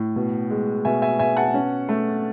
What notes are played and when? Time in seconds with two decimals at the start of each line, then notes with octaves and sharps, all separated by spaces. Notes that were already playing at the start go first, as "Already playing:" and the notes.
Already playing: A2
0.16 B2
0.50 G#3
0.85 B2 E5 G#5
1.02 E5 G#5
1.19 B2 E5 G#5
1.37 F#5 A5
1.54 C#4
1.89 A3